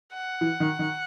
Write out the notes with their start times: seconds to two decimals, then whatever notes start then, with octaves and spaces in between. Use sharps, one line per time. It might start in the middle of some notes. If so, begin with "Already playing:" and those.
0.13 F#5
0.41 E3
0.60 D#3
0.79 D#3